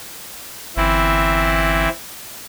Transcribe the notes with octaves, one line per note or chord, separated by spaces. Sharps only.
G1 E3 C4 E4